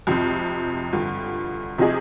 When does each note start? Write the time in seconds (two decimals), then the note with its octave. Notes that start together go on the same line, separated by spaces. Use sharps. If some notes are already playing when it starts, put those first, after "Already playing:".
0.07 F2 C3 F3 C4
0.93 G2 D3 F3
1.78 C3 F3 C4 D#4 G#4